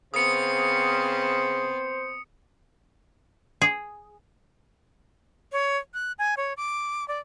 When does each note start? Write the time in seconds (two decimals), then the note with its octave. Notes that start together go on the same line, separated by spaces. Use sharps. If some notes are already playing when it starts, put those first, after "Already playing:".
0.14 C#3 B3 C4 C5 D#6 C#7
3.62 G#4
5.52 C#5
5.94 F#6
6.18 G#5
6.37 C#5
6.57 D6
7.08 D5